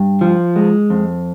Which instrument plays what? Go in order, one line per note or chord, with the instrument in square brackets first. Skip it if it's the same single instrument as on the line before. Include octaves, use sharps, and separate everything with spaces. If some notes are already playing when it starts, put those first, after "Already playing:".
Already playing: [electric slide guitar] G2
F3
G#3
F2